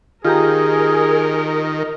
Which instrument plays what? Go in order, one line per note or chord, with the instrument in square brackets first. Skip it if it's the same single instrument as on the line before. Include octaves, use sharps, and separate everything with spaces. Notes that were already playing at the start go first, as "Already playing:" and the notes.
[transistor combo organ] D#3 [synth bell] F4 G4 A#5 [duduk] G#4 [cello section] A#4